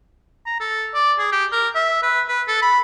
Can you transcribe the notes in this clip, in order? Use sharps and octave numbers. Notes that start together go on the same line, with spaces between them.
A#5
A4
D5
G#4
G4
A#4
E5
B4
B4
A4
B5